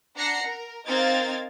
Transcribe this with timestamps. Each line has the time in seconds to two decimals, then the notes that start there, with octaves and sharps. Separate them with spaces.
0.16 D4 F#5 A#5 A#6 C7 C#7
0.46 A#4
0.86 C4 D#4 A#4 F5 G#6 A6